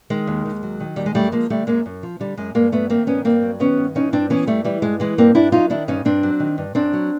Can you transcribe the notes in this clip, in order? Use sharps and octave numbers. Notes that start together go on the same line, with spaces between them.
D#3 G#3
D#2
D#2
F#3
D#3
D#2 G3
G#3
F#2 G3 A3
F3 G#3 A#3
D3 G3 A3
F#2 G#3 A#3
F#2
F3
D3 G3
F#2 G#3
G2 G#3 A#3
F#3 A3 B3
D#3 A#3 C4
G2 B3 C#4
G2 A#3 C4
F#3
D#3 B3 C#4
G2
E3 C#4 D#4
G2 C4 D4
E3 B3 C#4
G2 G3 A3
E3 G3
G2 G#3
E3 G#3
G2 A#3 C4
G2 D4 E4
F#3 D#4 F4
D#3 D4 E4
G2 C#4 D#4
G2 C4 D4
F#3
D#3
G2
F#2 C4 D4
F#3